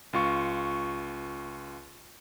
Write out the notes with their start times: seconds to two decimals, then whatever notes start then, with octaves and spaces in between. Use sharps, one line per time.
0.13 C#2 F4 C#6